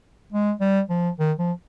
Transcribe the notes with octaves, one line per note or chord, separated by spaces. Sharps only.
G#3
G3
F3
D#3
F3